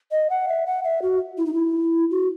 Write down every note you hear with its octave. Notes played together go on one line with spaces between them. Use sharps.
D#5
F#5
E5
F#5
E5
F#4
E4
D#4
E4
F#4